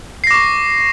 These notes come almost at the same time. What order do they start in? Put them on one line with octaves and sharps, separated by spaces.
C7 A#6 D6 C#6